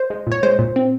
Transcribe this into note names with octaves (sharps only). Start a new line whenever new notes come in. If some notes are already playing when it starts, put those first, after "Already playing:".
Already playing: C5
G#3
A#2 C#5
G#3 C5
A#2
C4